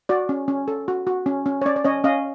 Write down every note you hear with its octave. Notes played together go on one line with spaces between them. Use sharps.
F#4 D5
C#4
C#4
A4
F#4
F#4
C#4
C#4
C#5
C#4 D5
D5
C#4 C#5 D#5
C#4 D#5 F5